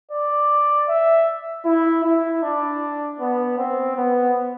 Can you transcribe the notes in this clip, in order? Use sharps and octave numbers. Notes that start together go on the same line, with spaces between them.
D5
E5
E4
E4
D4
B3
C4
B3